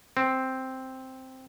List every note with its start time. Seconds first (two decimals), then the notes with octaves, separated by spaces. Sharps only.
0.17 C4